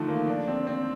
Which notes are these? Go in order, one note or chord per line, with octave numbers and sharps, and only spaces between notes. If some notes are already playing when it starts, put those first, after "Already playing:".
Already playing: D3 D#3 F3 A3
A#3
D4
C4
C4